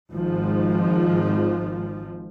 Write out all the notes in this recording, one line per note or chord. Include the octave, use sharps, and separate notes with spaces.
G#1 G#2 F3